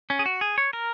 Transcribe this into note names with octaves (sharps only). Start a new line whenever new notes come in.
C#4
G#4
F#4
G#4
C#5
A#4